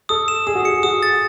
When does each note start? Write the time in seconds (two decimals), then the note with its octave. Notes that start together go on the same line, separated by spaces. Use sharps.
0.09 A4 D#6
0.28 E7
0.47 G#4 D#6
0.55 F#4
0.63 G#4 C#7
0.83 F#4 D#6
1.03 A6